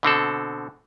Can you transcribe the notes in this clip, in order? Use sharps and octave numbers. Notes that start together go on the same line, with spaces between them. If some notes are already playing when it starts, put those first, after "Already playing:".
B2 D3 C4 A4